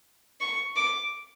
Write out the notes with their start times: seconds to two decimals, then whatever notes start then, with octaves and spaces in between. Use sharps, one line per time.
0.41 C#6
0.77 D6